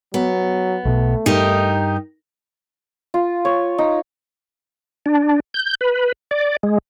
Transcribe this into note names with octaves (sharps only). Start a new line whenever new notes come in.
F#3 B3
B1 B2 A3
G2 D#4 G4 A#4
F4
C#5
D#4
D4
G6
B4
D5
G#3